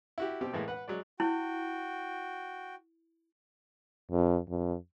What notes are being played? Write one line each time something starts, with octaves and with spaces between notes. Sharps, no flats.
E4 F#4 G4
B2 C4 G4
A2 E3 G#3 A#3
B4 F#5
F#3 G#3 D5
E4 F#4 G5
F2
F2